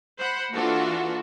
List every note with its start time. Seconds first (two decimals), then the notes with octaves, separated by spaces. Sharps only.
0.18 C5 F#5 B5
0.53 E3 A#3 D4 F4 F#4 A4